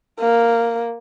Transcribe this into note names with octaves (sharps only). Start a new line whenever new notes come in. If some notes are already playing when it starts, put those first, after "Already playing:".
A#3